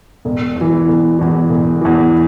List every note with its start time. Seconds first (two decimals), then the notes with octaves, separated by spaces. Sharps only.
0.25 E1
0.56 E2
0.61 E3
0.88 E1
1.19 E2 E3
1.50 E1
1.81 E2 E3